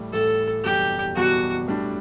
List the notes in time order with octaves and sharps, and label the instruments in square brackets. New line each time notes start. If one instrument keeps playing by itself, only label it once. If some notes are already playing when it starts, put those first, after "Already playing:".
Already playing: [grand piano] A1 A2 G3
[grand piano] A1 A2 G3 [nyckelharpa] A4
[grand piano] F#1 E2 B2 G3 [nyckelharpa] G4
[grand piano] F#1 E2 B2 G3 [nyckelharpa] F#4
[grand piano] A2 G3 D4